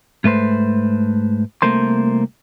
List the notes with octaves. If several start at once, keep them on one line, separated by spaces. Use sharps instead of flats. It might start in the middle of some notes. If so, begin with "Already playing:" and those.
G#2 A3 B4 C5
C2 G2 A3 A#3 C5 C6